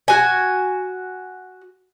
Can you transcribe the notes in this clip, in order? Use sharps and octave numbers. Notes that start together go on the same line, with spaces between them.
F#4 G#5